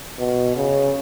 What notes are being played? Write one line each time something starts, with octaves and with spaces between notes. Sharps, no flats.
B2
C#3